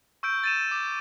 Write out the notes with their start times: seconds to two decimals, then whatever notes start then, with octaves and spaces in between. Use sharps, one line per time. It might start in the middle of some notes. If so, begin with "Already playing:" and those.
0.23 C#6 E6 G6 D7
0.44 A6 D#7 E7
0.71 D6